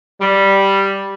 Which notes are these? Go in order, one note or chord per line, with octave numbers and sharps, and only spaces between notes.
G3